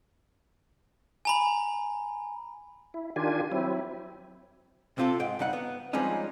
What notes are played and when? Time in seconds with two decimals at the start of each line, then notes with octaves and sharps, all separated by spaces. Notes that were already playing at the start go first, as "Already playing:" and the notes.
1.25 G#5 A#5 B5
2.94 E4
3.16 D#3 D4 F4 G4 G#5
3.52 F#3 C4 E4
4.98 C3 C4 F4 G#4 A4
5.20 G#2 G5
5.39 G2 C#3 D#4 F#5
5.53 B3
5.93 F3 G3 G#3 C4 C#4 D#4